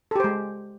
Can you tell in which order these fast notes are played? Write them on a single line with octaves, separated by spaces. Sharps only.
A4 G4 C5 G#3